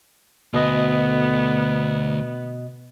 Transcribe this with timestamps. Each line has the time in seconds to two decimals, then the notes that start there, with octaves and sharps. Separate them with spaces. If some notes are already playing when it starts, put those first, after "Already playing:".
0.54 D2 B2 B3 D#5